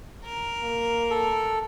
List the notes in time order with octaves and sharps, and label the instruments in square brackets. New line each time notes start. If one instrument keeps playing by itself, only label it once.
[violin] A#4
[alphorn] A#3
[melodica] A4